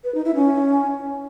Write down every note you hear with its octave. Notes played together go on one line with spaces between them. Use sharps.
B4
D#4
E4
C#4